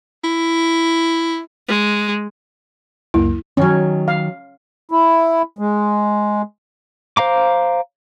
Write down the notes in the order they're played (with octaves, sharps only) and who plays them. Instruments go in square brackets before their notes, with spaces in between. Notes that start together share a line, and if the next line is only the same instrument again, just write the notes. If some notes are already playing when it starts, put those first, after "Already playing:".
[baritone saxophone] E4
[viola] G#3
[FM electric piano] C#2 F#2 A#3 [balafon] E4
[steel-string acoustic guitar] D#3 F#3 [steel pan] C#4
[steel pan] F5
[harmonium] E4
G#3
[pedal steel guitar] C5 F5 A#5 D6